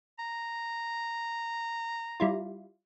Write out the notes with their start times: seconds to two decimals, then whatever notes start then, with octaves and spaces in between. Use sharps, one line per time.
0.19 A#5
2.20 G3 E4 F4